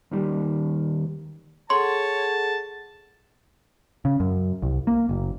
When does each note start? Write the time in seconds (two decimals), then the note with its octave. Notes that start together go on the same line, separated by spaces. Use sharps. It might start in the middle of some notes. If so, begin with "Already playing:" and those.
0.11 D#2 D#3 G3
1.70 G#4 A4 C#5 F#5 A5 C6
4.05 C#3
4.20 F#2
4.62 C2
4.87 A#3
5.09 F#1